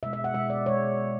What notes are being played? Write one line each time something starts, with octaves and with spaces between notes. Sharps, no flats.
B2 G#3 E5
E5
F#5
B2 G#3 E5
D5
B2 G#3 C#5